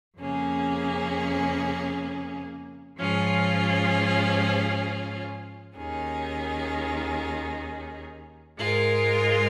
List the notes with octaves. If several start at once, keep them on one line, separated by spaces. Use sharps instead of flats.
F2 C#3 A#3 C#4 G#4
G#2 F3 C#4 F4 G#4
D#2 D#3 C#4 G#4
G#2 G#3 F4 A#4